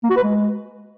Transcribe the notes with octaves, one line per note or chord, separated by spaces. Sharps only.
A#3
F#4
B4
G#3